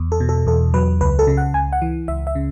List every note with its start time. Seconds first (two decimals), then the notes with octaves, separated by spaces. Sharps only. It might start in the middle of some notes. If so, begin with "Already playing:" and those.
Already playing: E2
0.12 A4
0.20 B2
0.29 A4
0.46 E2 A4
0.74 F#3 B4
1.01 C#2 B4
1.19 A4
1.27 C#3
1.37 F#5
1.54 C#2 G#5
1.73 F#5
1.82 E3
2.08 C#2 E5
2.27 E5
2.35 C#3